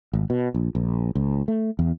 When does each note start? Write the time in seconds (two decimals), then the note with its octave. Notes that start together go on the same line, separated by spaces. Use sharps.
0.13 G#1
0.30 B2
0.54 A#1
0.75 A#1
1.15 C#2
1.48 A3
1.79 E2